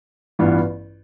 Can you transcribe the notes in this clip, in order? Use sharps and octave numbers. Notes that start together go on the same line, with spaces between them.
A1 G2 E3 B3 F4